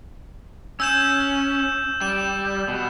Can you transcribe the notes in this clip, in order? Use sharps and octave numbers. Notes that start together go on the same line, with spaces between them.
C#4 E6 G6 E7
G3 E7
B2